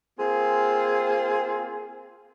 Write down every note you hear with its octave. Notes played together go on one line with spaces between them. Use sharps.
A#3 C4 F4 G#4